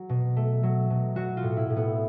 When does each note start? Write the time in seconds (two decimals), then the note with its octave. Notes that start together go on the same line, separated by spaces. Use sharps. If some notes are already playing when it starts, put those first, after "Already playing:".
Already playing: F#3
0.09 B2
0.36 A3
0.63 F#3
0.90 B2
1.16 F#3 F#4
1.37 F4
1.43 A2
1.57 E4
1.70 A2
1.76 B3